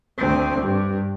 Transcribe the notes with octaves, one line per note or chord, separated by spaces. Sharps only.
D2 C4
G2